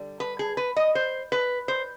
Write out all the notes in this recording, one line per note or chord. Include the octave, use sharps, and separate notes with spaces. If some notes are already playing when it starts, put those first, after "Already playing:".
Already playing: D3 G3
B4
G#4
B4
D#5
C5
B4
C5